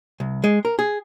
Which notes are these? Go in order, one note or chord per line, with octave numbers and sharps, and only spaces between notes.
C2
G#3
A#4
G#4